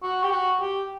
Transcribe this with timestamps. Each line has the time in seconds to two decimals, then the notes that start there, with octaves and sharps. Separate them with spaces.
0.03 F#4
0.23 G4
0.31 F#4
0.60 G4